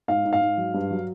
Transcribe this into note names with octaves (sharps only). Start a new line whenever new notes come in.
G#2 F5
G#2
F5
G#2
F#3
G2
F#3